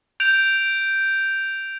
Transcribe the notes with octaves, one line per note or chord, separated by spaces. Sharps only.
G6 D7 F7